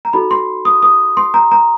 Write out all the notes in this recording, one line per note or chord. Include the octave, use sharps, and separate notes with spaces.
A#5
D#4 F#4 A4 B5
C6
D#6
D#6
C6
A#5
A#5